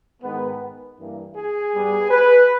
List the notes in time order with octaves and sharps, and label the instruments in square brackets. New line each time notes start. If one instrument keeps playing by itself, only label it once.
[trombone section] G#2 D#3 G#3 B3
G2 E3 A#3
G#4
G2 G3 B3
B4